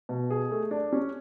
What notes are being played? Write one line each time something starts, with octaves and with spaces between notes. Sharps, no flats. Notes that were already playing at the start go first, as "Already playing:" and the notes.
B2
G#4
A3
D4
C#4